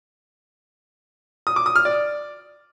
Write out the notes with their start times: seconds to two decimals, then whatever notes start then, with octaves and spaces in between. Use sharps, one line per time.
1.47 D#6
1.56 D6
1.66 D#6
1.76 F6
1.85 D5